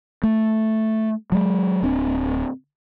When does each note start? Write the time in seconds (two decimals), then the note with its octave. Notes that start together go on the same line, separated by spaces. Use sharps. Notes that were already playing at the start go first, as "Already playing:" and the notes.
0.23 A3
1.32 F#3 G#3
1.83 D1 C4 D4